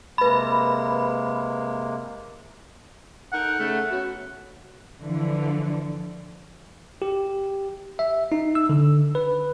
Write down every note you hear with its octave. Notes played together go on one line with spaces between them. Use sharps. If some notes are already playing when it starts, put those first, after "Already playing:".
C3 G#3 A#3 B4 B5
D#4 A4 A#4 F#5
C#3 A3
B3 C#4 F#4
D3 E3 F3
G4
E5
D#4
E6
D3
B4